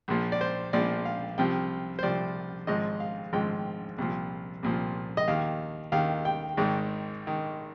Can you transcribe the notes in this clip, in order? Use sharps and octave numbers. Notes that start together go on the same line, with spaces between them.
A#1 A#2 F3
D5
C5
A#1 A#2 F3 D5
F5
C2 C3 F3 G5
C5
C2 C3 F3 D5
G#1 G#2 F3 D#5
F5
G#1 G#2 F3 G5
C2 A#2 F3
C2 A#2 F3
D#5
D#2 D#3 F5
D#2 D#3 F5
G5
G#1 G#2 D#3
D#3